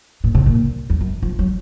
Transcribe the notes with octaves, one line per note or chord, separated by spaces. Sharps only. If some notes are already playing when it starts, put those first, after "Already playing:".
A#2
C3
A#2
F2
F#2
F3
F#3